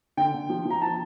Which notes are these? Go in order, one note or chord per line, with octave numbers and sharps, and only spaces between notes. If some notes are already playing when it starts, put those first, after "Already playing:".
D3 G5
D3
F3
F3
A#5
E3 A5